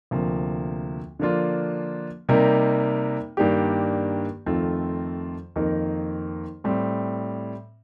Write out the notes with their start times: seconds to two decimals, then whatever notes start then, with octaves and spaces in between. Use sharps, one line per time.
0.11 D2 C3 F3 A#3
1.19 D3 F3 A#3 D4 F4
2.29 C3 G3 A#3 D#4 A#4
3.37 G2 D#3 A#3 D4 G4
4.46 F2 D#3 A3 C4 F4
5.56 F2 D#3 A#3 D#4 A#4
6.64 A2 G3 C4